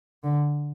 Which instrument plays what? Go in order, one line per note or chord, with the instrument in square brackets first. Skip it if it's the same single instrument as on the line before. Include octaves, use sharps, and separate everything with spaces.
[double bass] D3